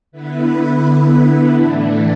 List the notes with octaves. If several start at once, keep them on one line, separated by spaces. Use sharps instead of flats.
D3 B3 E4 B4
A2 E3 A3 D4